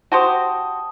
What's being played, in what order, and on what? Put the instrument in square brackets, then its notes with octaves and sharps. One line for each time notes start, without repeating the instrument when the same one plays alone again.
[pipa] F#4 G4 C5 [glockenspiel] A5 D#6